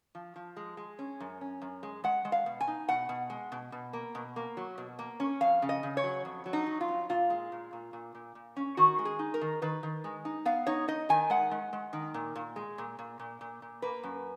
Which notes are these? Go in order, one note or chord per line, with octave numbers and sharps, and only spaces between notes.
F3
F3
G#3
G#3
C#4
F#2
C#4
F#2
G#3
G#3 F#5
G#3
F5
B2
G#5
D#4
B2 F#5
B2
G#3
B2
B2
A#3
B2
A#3
F#3
B2
A#3
C#4
F2 F5
C#3
D#5
C#3
C#5
F#3
F2
F#3
D#4
F#3
F4
F2
A#2 F4
G#3
A#2
A#2
A#2
A#2
A#2
C#4
D#3 F#4
G#3
G#4
D#4
A#4
D#3
D#3 B4
D#3
G#3
D#4
B3 F5
D#4 C#5
D#4 D#5
D#3 G#5
G#3 F#5
G#3
G#3
D#3
A#2
A#2
G#3
A#2
A#2
A#2
A#2
A#2
A#3 B4
F#2